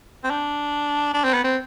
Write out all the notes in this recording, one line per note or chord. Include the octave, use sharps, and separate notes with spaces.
C4
D4
D4
C4
B3
C4